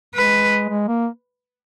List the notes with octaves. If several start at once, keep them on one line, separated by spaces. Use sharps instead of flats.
G#3 B4
G#3
A#3